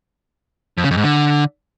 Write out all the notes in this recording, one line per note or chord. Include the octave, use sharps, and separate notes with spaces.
F2
C#3
F2
G#2
D3